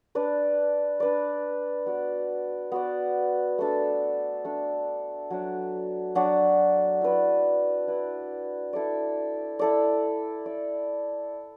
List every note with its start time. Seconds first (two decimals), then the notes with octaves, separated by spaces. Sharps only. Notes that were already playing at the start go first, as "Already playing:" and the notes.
0.15 D4 B4 D5
1.00 D4 B4 D5
1.86 B3 F#4 D5
2.72 B3 F#4 D5
3.58 A3 D4 A4
4.44 A3 D4 A4
5.30 F#3 D4 F#4 D5
6.15 F#3 D4 F#4 D5
7.01 E4 B4 D5
7.88 E4 B4 D5
8.73 E4 A4 D5
9.59 E4 A4 D5
10.46 E4 D5